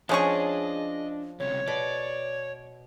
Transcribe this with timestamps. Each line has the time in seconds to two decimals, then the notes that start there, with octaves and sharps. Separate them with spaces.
0.09 F3 G#3 C#4 D4 G#4 D#5 C#6
1.40 C#2 C3 C#5
1.68 B2 D5